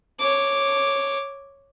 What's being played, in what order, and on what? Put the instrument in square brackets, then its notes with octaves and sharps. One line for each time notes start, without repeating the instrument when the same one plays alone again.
[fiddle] C#5 D6